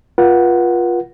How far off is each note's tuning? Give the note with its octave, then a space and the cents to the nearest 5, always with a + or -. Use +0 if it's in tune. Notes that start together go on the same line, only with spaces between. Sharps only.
F4 +5 B4 -40 F#5 +0